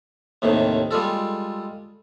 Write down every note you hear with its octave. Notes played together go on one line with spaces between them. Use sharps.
D#2 A2 C3 D#3
G3 G#3 F4 A4